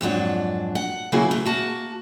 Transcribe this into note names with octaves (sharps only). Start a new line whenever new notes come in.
F2 G#2 F#3 D4
F#5
C#3 F#3 A#3 E4 F#4 G#4
E2 A3
A#3 F#4 A5